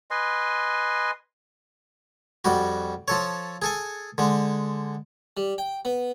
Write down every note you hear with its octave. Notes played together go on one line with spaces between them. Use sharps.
B4 D#5 G#5 C6
F2 G3 F#4
F3 A4 C#5
G#4 A4 G#5
D3 G#3
G3
G5
B3